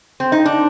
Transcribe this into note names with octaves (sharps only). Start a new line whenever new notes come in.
C4
D#4
D4